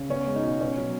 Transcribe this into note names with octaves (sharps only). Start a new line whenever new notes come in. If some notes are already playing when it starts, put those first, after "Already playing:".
Already playing: C#3
B3 C#4
G#3
D#4
B2
B3 C#4
F#3